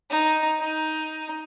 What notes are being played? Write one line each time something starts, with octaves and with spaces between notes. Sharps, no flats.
D#4
D#4